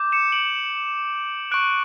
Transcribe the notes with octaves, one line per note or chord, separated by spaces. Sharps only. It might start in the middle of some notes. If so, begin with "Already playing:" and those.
Already playing: D6 G6
C#7 E7
D7 F#7
C#6 F#6 D7 F#7